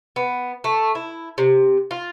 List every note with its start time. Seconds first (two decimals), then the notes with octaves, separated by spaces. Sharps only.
0.16 B3
0.64 A3
0.95 E4
1.38 C3
1.91 F4